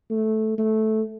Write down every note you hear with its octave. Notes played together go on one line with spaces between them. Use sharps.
A3
A3